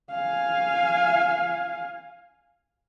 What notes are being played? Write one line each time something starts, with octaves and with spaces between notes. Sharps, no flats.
F5 G#5